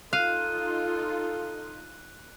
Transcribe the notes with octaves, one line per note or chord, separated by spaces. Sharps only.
D#4 F4 A4 F5 F#6 D#7